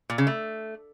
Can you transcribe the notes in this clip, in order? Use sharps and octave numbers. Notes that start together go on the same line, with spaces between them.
A#2
C#3
A3